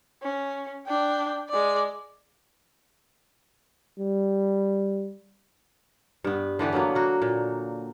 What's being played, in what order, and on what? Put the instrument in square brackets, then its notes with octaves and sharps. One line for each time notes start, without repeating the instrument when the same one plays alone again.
[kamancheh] C#4
D4 G5
G#3 D5
[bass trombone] G3
[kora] G2 B3
D3 E3 B3 G4
D3 F#3 A#3 B3
A#3 F#4
A#2